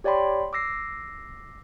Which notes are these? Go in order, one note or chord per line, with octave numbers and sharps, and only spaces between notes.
G4 C#5 D5 G5 B5 C6
D6 E6 A#6 C7